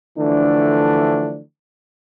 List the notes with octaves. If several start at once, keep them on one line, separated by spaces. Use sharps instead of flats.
D3 E3 F3 A3 D4